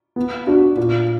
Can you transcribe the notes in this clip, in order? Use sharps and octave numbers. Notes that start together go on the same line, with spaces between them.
B3
D4 F#4
A#2